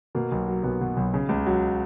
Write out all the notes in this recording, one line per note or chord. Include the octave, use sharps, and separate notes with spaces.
B2 A#3
B1
F#3
B1 B3
B2
B1
C#3
C#2
F#3